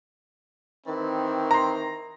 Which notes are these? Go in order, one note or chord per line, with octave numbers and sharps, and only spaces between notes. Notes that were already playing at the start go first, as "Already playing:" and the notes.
D#3 E3 C4
A#5 C6